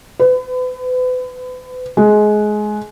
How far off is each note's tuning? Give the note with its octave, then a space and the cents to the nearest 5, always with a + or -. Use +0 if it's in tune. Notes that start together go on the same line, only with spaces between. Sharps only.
B4 +35
G#3 +20